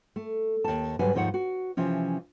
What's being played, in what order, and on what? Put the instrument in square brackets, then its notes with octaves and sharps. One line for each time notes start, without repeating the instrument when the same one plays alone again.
[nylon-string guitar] A3
D#2 A5
D2 G#2 F#3 G3 B4 G#5
D#2 G#2 F3 D#4 C#5 F#5
F#4
C3 E3 F3 C#4